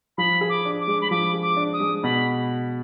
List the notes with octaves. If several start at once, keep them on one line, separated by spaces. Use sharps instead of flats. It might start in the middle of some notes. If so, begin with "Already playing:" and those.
F3 B5
G#4
D6
D4
D6
G#3
B5
F3 D6
G#4
D6
D4
D#6
G#3
B2 B5